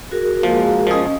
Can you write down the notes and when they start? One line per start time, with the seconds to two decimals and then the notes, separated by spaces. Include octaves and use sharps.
0.12 F#4 G#4 A#4
0.43 F3 G#3 A#3
0.87 F3 C#4 G#4 D#5